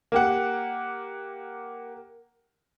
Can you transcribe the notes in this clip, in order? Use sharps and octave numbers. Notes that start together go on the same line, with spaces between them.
A#3 G4 F#5